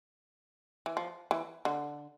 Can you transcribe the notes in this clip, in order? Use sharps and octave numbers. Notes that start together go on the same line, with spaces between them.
E3
F3
E3
D3